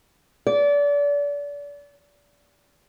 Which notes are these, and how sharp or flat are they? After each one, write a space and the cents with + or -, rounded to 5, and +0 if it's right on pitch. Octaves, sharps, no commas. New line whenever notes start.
D5 -30